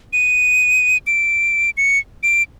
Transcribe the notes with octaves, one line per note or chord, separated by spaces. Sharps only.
D#7
D7
C#7
D7